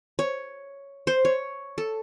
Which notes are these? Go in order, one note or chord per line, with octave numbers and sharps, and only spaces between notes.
C#5
C5
C#5
A4